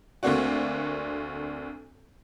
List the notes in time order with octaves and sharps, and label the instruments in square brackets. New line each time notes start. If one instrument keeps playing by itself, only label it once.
[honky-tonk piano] D2 A3 A#3 C4 D4 F#4